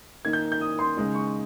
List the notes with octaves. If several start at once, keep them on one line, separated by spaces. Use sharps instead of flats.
D#3 A#3 D#4 G#6
G6
G6
D#6
C6
C#3 G#3 D#4
C#6